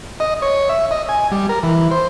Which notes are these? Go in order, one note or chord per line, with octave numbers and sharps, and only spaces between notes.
D#5
C#5
E5
D#5
G#5
G3
A#4
E3
C5